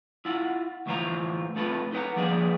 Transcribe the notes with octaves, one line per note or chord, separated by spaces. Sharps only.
E4 F4 F#5
D2 A2 E3 F4 C5 A#5
A3 C4 F4 A4 B4
D#4 B4 C5 F#5 A#5
F3 G3 A#3 G#4 B4 D5